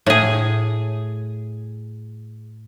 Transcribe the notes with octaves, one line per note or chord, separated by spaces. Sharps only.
A2 G#4